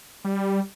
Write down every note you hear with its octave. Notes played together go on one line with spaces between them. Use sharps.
G3